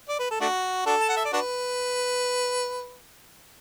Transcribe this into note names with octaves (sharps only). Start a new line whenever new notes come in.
D5
B4
A4
A3 D4 F#4
D4 F#4 A4
A5
F#5
E5
D5
D4 F#4 B4